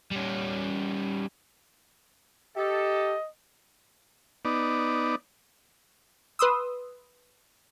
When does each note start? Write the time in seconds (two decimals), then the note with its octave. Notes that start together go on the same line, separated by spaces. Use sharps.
0.11 G3 C#4
2.57 G4 A4 D#5
4.45 B3 D#4 D5
6.39 B4 C6 D#6 E6